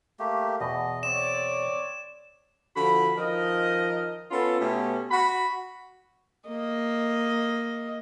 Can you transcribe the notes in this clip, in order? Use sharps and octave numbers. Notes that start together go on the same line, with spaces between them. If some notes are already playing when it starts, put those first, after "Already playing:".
A3 A#3 G4
E2 B2 D#5
C4 C#5 D5 E7
D3 F3 F#4 B5
D#3 F3 A#4 D#5
B3 C#4 F4 A4
B2 A3 B3 C#4 G4
F#4 B5
A#3 D#5